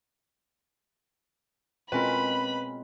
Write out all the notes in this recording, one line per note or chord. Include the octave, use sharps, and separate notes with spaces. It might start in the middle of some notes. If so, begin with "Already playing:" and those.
B2 G#3 C4 C#4 F4 A#4 B4 B5